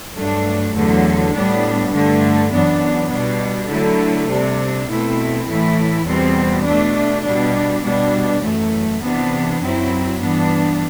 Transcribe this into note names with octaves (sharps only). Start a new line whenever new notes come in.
G2 F#3 A3 D4
E2 D3 F#3 A3
A2 G3 B3 D4
G2 D3 A3 D4
F#2 E3 B3 D4
B2 G3 D4
D3 F#3 A3 E4
C3 G3 D4
B2 A3 C4 E4
A2 E3 A3 E4
E2 B2 G3 C4
B2 A3 D4
B2 G3 D4
B2 G3 D4
F#2 E3 A3
C3 E3 B3 D4
F#2 F#3 C4 E4
G2 E3 B3 D4